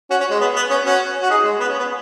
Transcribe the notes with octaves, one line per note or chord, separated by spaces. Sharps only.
C#4 F#4
C#4
G#3
B3
B3
C#4
C#4 F#4
F#4
D#4 G#4
G#3
B3
C#4
B3